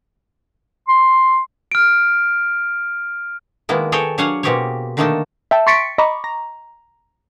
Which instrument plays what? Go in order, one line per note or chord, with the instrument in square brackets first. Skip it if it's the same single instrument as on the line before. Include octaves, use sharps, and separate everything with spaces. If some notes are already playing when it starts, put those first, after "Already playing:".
[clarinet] C6
[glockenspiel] F6 D7
[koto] D#3 G#3 A#3 B3 E4
G#4 A4 C#5 D#5 G5
F#3 D4 C#5 F5 F#5 G#5
B2 A#3 C4 G4 G#4 C#5
D3 D#3 A3 A#3 D#4 A4
[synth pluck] E5 G5 A5
C6 C#6 A6 B6 C#7 D7
D#5 A#5 B5 C#6 D6
A#5